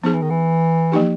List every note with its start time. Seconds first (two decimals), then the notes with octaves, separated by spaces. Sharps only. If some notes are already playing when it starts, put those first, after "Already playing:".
0.04 F3 B3 D#4 G#4
0.13 E3
0.22 D#3
0.30 E3
0.92 F3 A#3 D#4 G4